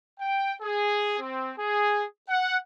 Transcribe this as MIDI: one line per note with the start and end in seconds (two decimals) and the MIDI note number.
0.20 0.54 79
0.62 1.17 68
1.19 1.52 60
1.58 2.04 68
2.29 2.57 78